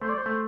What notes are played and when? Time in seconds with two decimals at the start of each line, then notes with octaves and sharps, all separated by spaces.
0.02 A3 C5
0.09 D5
0.17 C5
0.26 A3